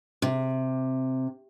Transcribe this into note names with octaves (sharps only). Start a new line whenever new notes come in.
C3